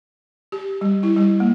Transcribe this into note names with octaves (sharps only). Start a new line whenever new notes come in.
G4
G3
E4
G3
A#3